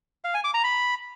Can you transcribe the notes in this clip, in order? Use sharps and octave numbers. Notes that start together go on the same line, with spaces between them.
F5
G#5
D6
A#5
B5